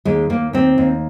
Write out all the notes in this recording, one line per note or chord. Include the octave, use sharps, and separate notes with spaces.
D#2 G#3
D#2 A#3
D#2 C4
D#2